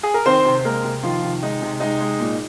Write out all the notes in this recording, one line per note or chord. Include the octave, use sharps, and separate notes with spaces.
G#4
A#4
D#3 C4 C5
C3
C5
G#3 A#3 A#4
C3
D#3 F3 F4
C3
G#3 D#4
C3
G#3 D#4
G#3
A#2